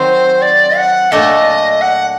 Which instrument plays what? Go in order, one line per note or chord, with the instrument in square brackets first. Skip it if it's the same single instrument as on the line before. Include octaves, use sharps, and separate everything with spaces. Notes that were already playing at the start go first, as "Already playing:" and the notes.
Already playing: [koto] D#3 F#3 C4 [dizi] C5
[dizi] D5
F#5
[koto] A#2 A3 D4 A4 [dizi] D#5
[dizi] F#5